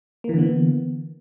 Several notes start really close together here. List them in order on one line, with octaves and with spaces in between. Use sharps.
A#3 E3 D3 B3